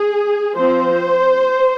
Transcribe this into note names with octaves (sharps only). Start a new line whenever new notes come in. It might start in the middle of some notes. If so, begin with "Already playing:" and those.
Already playing: G#4
F3 C4 C5